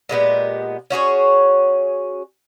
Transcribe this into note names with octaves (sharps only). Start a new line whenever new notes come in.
A#2 G#3 B3 G4
C#4 F#4 G#4 C#5